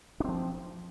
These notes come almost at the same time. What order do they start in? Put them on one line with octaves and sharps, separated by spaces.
D4 C4 F3